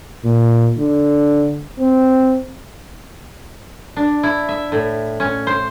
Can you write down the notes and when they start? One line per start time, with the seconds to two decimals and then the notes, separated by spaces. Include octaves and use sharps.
0.24 A#2
0.78 D3
1.79 C4
3.96 D4
4.23 E4
4.49 E5
4.72 A2
5.20 C#4
5.47 C5